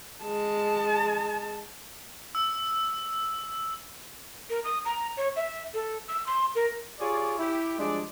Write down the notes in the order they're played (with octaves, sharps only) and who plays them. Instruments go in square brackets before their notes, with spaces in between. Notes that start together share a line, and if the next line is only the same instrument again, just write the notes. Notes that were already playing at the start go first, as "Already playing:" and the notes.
[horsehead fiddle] G#3 A5
[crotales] E6
[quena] A#4
D#6
A#5
C#5
E5
A4
E6
C6
A#4
[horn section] F4 G4 G#4 C#5 D5
E4 G4
F3 G3 G#3 D4 G#4 D5